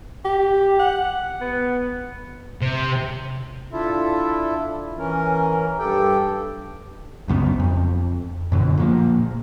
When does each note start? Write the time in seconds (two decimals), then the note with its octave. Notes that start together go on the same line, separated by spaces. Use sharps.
0.25 G4
0.79 F#5
1.41 B3
2.61 C3
3.73 D4 E4 F4 A4 E5
4.99 E3 C#4 A#4
5.79 G2 G4 A4 G5
7.28 C2 F#2 C#3 B3
7.60 F2
8.52 F#2 B2 D3
8.77 A#2 F3 A#3